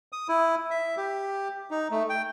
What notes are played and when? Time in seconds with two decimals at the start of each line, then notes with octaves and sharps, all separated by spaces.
0.13 D#6
0.29 E4
0.71 E5
0.97 G4
1.71 D#4
1.91 A3
2.09 G5